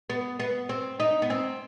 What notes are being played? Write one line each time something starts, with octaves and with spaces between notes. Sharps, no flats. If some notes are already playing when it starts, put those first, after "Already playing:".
B3
B3
C4
D#4
B3
C4